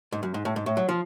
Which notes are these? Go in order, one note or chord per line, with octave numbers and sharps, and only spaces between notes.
G#2
F#2
G#2
A2
G#2
A2
F#3
F3